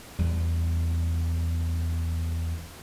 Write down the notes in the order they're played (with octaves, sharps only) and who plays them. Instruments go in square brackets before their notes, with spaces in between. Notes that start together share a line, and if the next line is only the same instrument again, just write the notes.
[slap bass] E2 G3